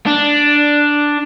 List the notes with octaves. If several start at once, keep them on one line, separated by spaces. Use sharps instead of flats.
D4